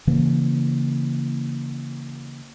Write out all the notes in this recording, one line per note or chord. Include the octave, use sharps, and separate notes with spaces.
C#3 E3 A#3